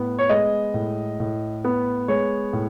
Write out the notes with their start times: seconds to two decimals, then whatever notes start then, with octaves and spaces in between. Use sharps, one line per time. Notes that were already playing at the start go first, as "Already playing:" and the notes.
Already playing: A2 B3
0.19 C#5
0.30 G#3 D#5
0.74 A2
1.20 A2
1.65 B3
2.08 G#3 C#5
2.53 A2